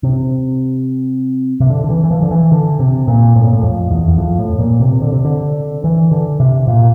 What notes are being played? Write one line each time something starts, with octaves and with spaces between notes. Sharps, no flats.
C3
C3
D3
D3
E3
E3
F3
D3
E3
D3
C3
A#2
A2
A#2
A2
F2
E2
E2
F2
A2
A#2
C3
D3
C3
D3
E3
D3
C3
A#2